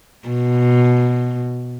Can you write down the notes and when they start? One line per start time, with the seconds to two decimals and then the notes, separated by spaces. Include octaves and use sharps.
0.29 B2